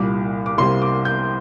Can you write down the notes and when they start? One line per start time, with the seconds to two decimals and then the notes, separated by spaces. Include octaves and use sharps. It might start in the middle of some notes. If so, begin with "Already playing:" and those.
Already playing: C2 A#2 G3 D6
0.46 D6
0.58 C2 C3 G3 A#3 C6
0.82 D6
1.05 G6